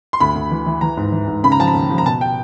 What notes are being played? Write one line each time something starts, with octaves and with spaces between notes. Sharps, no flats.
C6
D2 B5
D2
E3
E3
E3 A#5
G#2
E3
G#2
C#3 B5
A#5
F3 A5
A#5
D#2
F3
A#5
B2 A5
G5